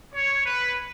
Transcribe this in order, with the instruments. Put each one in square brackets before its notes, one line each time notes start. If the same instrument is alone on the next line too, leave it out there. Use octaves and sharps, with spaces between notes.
[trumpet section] C#5
B4